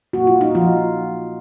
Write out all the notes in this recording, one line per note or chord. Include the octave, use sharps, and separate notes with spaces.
A#2 F#3 A#3 F#4
F4
D#4
F3 F4